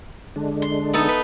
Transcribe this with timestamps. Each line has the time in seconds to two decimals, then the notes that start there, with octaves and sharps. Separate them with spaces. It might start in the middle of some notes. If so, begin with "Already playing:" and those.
0.36 D3 G#3 D4
0.62 C6
0.93 B3 D#4 A4
1.08 B4